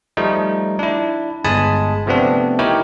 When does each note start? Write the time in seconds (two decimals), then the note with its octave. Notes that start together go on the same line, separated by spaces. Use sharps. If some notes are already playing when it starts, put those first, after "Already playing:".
0.17 F3 G3 A3 D#4
0.79 D4 E4
1.44 G1 G#3 G#5 A5 B5 D#6
2.06 C3 F3 A3 B3 C4 D4
2.59 D#4 E4 G4 A#4 C#5